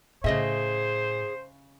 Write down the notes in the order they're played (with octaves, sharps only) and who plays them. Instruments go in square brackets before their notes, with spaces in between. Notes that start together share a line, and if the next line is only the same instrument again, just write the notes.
[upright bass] A2 [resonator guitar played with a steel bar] C#3 D#5 E5 [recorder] G#4 [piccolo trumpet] C5